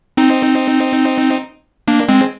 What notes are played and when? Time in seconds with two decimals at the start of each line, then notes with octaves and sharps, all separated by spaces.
0.17 C4 D#4
1.88 A#3 D4
2.08 G#3 C4